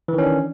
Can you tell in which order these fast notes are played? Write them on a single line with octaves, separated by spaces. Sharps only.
E3 D#3 C#4 D4